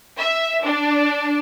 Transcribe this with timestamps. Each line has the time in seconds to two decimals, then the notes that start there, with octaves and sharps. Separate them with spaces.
0.18 E5
0.64 D4